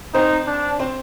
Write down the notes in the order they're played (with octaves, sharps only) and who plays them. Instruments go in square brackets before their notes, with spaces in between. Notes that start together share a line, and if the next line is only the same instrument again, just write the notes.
[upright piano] C4 C5 [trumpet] D#4
[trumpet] D4
[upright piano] C4 C5